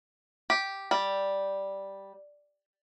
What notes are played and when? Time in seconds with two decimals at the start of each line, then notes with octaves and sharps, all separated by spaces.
0.50 G4
0.91 G3